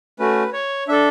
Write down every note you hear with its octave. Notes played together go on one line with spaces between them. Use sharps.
A3 C#4 F#4 B4
C#5
D4 A4 E5